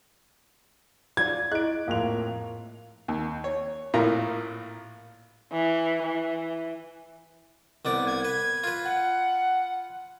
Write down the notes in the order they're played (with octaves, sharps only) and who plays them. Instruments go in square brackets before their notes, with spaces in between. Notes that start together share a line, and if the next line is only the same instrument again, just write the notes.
[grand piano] F4 D5 [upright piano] G#6
[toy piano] E4 G#4 D#5 [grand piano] F#6 D7
[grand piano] F2 A2 F7 [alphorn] A#3 [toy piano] F5 C6
[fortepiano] D#2
C#5
A#1 A2 F4 A#4 A#5
[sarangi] E3
E3
[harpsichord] C2 B3 D5
[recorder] G#6
[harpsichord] B4
F4 B4
[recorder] F#5